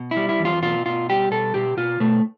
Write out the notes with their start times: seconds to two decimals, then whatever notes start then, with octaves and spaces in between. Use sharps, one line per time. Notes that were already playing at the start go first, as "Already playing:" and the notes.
Already playing: B2
0.11 E4
0.17 G3
0.29 E4
0.39 E2
0.45 F4
0.62 B2 F4
0.86 B2 F4
1.09 G3 G4
1.31 B2 A4
1.54 B2 G4
1.77 B2 F4
2.00 B2 A3